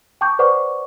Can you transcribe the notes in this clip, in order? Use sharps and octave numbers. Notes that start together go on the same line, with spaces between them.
G5 A5 C#6 D6 G6
B4 C5 D5 F#5 C#6 D6